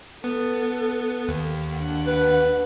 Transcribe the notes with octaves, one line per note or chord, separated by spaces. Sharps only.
B3 A4
D#2
D4 F#5
B4